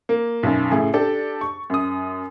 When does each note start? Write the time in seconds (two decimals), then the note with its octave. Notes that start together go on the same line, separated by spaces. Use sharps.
0.09 A#3
0.43 B1 F#2
0.71 A2 C#3 G#4
0.93 D4 G4 A4 A5
1.41 C#6
1.70 F#2 D#6